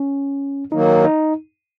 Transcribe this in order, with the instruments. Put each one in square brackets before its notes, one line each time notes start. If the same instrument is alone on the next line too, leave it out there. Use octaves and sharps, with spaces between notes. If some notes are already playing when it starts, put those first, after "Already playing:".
Already playing: [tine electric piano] C#4
[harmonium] D#3 F#3 A#3 [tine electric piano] D#4
[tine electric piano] D#4